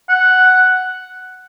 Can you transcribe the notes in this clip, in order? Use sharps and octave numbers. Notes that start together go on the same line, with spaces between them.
F#5